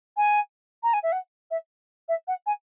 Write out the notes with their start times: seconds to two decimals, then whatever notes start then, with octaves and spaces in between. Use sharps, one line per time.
0.17 G#5
0.83 A#5
0.93 G#5
1.03 E5
1.12 F#5
1.51 E5
2.09 E5
2.28 F#5
2.46 G#5